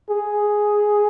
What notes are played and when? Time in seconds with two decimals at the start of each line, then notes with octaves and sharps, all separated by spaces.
0.10 G#4